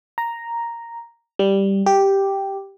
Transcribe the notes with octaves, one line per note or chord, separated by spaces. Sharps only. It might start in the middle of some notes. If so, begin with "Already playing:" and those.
A#5
G3
G4